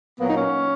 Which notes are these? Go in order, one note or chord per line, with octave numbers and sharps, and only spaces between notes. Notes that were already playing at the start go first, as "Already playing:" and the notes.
A#2 F#3 A#3 B3
D#4
C#4